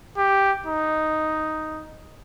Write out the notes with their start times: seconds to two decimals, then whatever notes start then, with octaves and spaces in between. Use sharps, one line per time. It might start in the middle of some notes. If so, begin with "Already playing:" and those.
0.17 G4
0.66 D#4